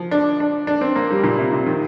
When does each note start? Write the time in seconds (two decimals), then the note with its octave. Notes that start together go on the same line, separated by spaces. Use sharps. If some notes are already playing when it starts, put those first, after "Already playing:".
Already playing: F3
0.11 D4
0.40 D4
0.67 D4
0.81 C4
0.96 A#3
1.11 G3
1.23 A#2
1.38 C3
1.52 C3
1.66 D#3